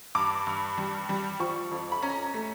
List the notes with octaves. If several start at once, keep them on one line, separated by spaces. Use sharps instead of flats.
G2 D6
G2
G3
G3
F3 C#6
F2
B5
C#4 A#5
A3